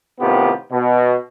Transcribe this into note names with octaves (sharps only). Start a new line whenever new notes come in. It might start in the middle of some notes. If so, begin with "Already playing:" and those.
A2 C3 D#3 B3 F4 G4
B2